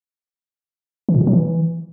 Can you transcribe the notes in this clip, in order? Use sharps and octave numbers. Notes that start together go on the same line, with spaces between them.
E3
A#2
B2
F#3
E3